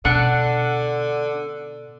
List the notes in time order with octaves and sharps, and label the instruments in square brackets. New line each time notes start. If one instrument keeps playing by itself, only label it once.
[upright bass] B2 [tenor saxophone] D3 [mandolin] D4 F#5